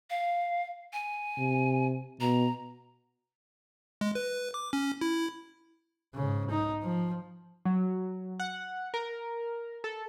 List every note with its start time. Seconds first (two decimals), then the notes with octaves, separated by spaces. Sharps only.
0.10 F5
0.93 G#5
1.39 C3
2.21 B2 A#5
4.01 G#3
4.15 B4
4.54 D6
4.73 C#4
5.01 E4
6.14 G#2 C#3
6.50 D#4
6.83 F3
7.65 F#3
8.40 F#5
8.94 A#4
9.84 A4